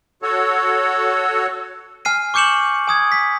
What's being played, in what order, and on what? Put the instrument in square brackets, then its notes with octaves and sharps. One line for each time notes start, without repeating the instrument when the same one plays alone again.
[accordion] F#4 A4 C#5
[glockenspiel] G#5 F6 C7 D#7
C#6 D6 G6 C#7 E7 F#7
G#5 D#6 G#6
B6